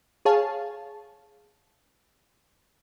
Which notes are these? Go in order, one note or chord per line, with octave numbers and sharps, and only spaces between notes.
G#4 C#5 F5 A5